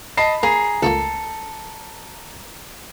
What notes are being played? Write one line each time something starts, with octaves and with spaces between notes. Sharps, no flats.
D#5 A5 B5 C7
A#3 G#4 A#5
C#2 A3 A#3 A4